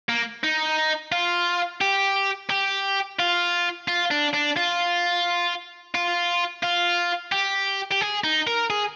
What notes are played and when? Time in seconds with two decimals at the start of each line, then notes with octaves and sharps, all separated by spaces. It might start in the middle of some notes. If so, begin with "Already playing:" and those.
0.09 A#3
0.43 D#4
1.12 F4
1.81 G4
2.50 G4
3.19 F4
3.88 F4
4.11 D4
4.33 D4
4.56 F4
5.94 F4
6.63 F4
7.32 G4
7.91 G4
8.01 G#4
8.24 D#4
8.47 A#4
8.70 G#4